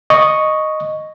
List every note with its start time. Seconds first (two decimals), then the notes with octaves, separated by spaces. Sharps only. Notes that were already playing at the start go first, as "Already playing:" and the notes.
0.10 D#5 C#6